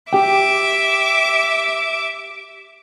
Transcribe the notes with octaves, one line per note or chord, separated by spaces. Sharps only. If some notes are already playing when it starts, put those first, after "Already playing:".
G4 E5 G5 D6